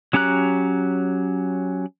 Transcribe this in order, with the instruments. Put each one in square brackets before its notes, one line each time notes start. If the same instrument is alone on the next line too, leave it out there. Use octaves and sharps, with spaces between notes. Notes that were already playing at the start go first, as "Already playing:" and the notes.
[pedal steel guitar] F#3 C#4 G4 A#5 F#6